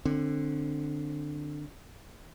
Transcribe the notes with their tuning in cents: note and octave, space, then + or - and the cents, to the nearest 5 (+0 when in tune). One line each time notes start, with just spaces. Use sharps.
D3 +15 C4 +20